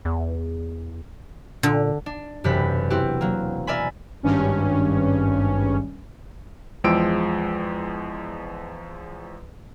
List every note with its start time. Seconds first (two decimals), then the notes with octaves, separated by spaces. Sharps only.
0.05 E2
1.63 A#2 D3
2.06 D4
2.44 E1 F#2 C3 G4 B5 B6
2.90 C4 E4 F#4 G4
3.21 F#3 A#3
3.67 A#4 D5 E5 G#5 B5
4.23 G#1 G2 C#4
6.84 E2 F3 G#3 G5 E6 D7